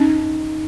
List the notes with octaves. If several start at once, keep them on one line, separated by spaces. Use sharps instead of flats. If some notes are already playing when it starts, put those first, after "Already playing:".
Already playing: C#4 D#4